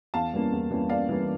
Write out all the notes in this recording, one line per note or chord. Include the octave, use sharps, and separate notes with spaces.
E2 F5 A5
E3 G3 A#3 C#4
E2
E3 G3 A#3 C#4
E2 D5 F5
E3 G3 A#3 C#4